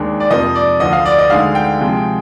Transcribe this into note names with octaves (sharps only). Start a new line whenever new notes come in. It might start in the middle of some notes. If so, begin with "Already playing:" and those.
Already playing: D#2 D#3 G#3 D4 G5
D5
F2 C3 F3 A#3 D#5
D5
D2 D3 F3 D#5
F5
D5
D#5
D2 D3 G#3 D#4 F5
G5
C3 F3 G#3